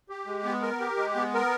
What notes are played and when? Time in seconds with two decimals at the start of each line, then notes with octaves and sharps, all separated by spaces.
0.09 G4
0.27 G#3
0.45 B3
0.62 A#4
0.80 G4
0.97 G#3
1.16 B3
1.34 A#4